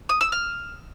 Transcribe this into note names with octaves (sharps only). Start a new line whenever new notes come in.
D#6
E6
F6